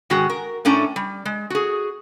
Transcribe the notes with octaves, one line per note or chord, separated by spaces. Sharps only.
G#2 D#3 G#3 F#4
A#4
A2 A3 C#4 D4 A#5
G3
G#3
F#4 G#4